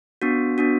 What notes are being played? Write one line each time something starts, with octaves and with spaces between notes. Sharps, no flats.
B3 D4 F#4
B3 D4 F#4